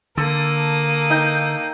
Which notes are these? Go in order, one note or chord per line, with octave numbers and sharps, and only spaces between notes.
D3 A#3 A4 D#6
D#4 G5